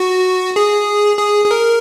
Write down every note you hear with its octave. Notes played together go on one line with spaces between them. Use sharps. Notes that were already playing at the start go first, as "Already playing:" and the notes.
Already playing: F#4
G#4
G#4
G#4
A#4